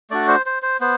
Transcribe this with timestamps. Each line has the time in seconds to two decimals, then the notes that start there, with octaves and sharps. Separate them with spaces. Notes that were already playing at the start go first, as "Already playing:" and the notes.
0.10 A3 D4 F#4 D5
0.28 C5
0.46 C5
0.63 C5
0.81 B3 C5